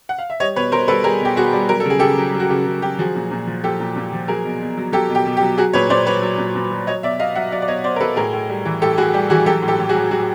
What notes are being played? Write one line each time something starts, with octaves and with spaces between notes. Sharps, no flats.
F#5
F5
E5
G3 C#5 D#5
B2 B4 C#5
B2 A#4 C5
G3 A4 B4
G3 G#4 A#4
B2 G4
B2 F#4 G#4
G3
F#3 A#4
A4
C#3 G#4
C#3 G4 A4
F#3
F#3
F#4
C#3 G4
C#3
F#3 G4
F3 F#4 G#4
A#2
A#2
F3
F3 G4 A4
A#2
A#2
F3
F#3 G#4 A#4
B2
B2
F#3
F#3 G4 A4
B2
G4
B2
G4
F#3
F#3 F#4 G#4
A#2 B4 C#5
A#2 C5 D5
F#3 B4 C#5
F#3
A#2
A#2
F#3
F#3 C#5 D#5
B2 D5 E5
B2 D#5 F5
F#3 E5 F#5
F#3 D5 E5
D5
B2 C#5 D#5
B2 C5 D5
A#4
F#3 A4 B4
A2 G#4 A#4
A2
G3
E3
A2 G4 A4
A2 F#4 G#4
G3 G4
E3 F#4 G#4
F#3 G4 A4
A2
G4 A4
A2
F#4 G#4
F#3
F#3 F#4 G#4